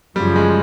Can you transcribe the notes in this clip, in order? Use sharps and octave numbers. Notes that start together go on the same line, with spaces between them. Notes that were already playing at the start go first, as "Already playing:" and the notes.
F#2 C#3 F3 G3
G#3